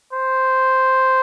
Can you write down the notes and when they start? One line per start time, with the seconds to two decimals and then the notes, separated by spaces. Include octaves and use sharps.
0.13 C5